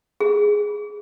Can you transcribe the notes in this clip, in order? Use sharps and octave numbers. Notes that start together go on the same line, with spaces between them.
G#4